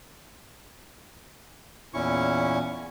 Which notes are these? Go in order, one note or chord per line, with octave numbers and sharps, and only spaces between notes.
E2 A#2 C#4 E4 C#6